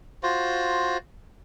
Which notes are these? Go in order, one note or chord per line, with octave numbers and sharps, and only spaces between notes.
F4 F#4 C5